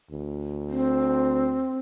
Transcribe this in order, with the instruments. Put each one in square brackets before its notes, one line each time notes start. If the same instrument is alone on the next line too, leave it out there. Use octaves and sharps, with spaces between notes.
[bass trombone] D2
[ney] C4